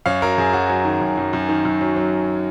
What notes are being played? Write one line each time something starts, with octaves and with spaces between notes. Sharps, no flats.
F#2 C#5 F5
F#3 A#4 C#5
F#2 G#4
F#3 F#4
F#3
D#3
F#2
F#2
F#2
D#3
F#2
F#3
F#3